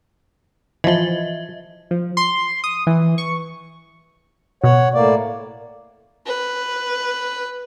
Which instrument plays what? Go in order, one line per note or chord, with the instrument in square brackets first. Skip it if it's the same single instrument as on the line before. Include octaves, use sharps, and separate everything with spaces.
[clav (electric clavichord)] E3 F3 [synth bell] D#5 E5
[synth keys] F3
C6
D#6
E3
C#6
[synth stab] B2 [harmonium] C#5 F#5
[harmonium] A2 A#3 D5
[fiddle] B4